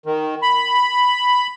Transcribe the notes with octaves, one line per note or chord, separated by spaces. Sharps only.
D#3
B5